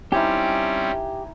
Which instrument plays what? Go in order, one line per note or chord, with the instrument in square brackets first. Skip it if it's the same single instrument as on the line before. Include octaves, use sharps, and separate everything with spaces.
[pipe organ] G3 C4 C#4 [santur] D#4 E4 G#5 [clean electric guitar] G4